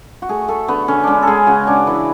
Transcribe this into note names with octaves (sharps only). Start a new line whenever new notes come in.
F#4
A3 G#4
A3 A4
D3 B3
D3 C#4
G#3 C#4 D4
G#3 G#4 A4
C#3 F#4
C#3 D4
E3 E4